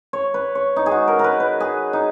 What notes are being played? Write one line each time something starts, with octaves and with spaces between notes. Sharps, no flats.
C#5
B4
C#5
D#4
G#4
F#4
A#4
A#4
B4
B4
G#4
D#4